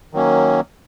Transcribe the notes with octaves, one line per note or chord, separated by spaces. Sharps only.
D#3 F#3 A#3 C#4